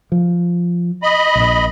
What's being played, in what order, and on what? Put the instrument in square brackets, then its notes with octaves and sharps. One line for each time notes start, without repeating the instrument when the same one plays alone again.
[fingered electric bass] F3
[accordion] D#5 B5
[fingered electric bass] A#1 A#2